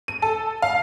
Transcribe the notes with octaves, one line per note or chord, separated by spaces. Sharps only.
D#7
A4
F5